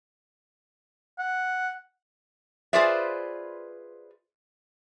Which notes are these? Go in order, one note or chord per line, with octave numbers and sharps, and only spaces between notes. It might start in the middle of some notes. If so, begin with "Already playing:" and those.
F#5
F4 G#4 B4 C5 D5 E5